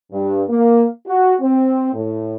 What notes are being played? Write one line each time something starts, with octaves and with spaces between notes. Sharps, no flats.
G2
A#3
F#4
C4
A2